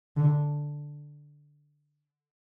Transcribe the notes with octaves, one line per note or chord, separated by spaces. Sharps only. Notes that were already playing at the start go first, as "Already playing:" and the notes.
D3